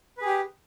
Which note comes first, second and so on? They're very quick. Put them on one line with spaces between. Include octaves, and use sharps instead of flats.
B4 G#4 G4